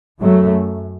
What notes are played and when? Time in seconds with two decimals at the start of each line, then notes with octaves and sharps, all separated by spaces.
0.20 F#2 F#3 A3